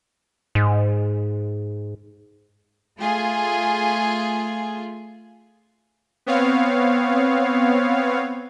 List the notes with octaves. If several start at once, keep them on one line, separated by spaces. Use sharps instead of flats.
G#2
A3 F4 G#4
B3 C4 C#5 F5